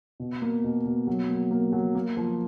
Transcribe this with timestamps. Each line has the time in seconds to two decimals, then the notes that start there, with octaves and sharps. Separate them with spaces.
0.20 B2
0.42 A#3
0.64 B2
0.85 B2
1.07 F#3
1.29 A#3
1.51 A#3
1.72 F#3
1.95 A#3
2.17 F3